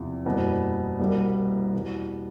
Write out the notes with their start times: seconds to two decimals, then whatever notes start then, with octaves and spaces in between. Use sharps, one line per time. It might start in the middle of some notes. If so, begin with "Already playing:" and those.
Already playing: E2 C3 F3
0.25 F#1 E2 B2 G3
0.99 C2 B2 G3 A#3
1.73 E2 B2 G3